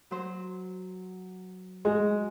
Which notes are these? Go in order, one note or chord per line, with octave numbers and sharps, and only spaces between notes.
F#3 C5
G#3 F#4